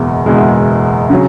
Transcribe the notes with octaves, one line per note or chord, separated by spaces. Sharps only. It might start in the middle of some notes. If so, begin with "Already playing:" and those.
Already playing: F#1 E2 B2 G#3
F#1 E2 B2 G#3
C#3 F#3